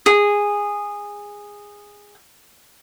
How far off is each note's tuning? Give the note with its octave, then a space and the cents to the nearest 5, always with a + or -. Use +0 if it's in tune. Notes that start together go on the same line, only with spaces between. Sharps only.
G#4 -15